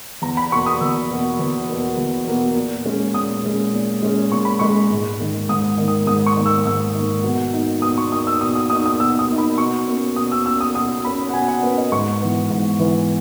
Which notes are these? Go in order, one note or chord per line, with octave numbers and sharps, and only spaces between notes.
E2 A#5
B5
B2 A#3 C#6
D#6
E2 E6
B2 A#3
E2
B2 A#3
E2
B2 A#3
A#2
G#3 C#4
A#2 D#6
G#3 C#4
A#2
G#3 C#4
A#2 C#6
B5
G#3 C#4 C#6
G#2
D#3 A#3
G#2 D#6
D#3 A#3
D#6
G#2 D#6
C#6
D#3 A#3
E6
G#2 E6
D#3 A#3
B2
A#3 D#4
B2 D#6
C#6
A#3 D#4 D#6
E6
B2 D#6
D#6
A#3 D#4 D#6
D#6
B2 E6
D#6
A#3 D#4
B5
B2 C#6
A#3 C#4
B2 D#6
E6
A#3 C#4 E6
D#6
B2 D#6
A#3 C#4 B5
F#5
B2 G#5
F#5
A#3 C#4 B4
D#5
G#2 C#6
E3 B3
G#2
E3 B3